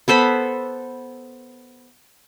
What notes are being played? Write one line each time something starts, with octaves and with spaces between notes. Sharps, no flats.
B3 A4 C5 B5